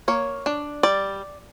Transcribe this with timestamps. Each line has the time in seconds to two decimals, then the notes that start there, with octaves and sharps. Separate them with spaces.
0.08 A#3 C#5
0.46 D4
0.83 G3 D5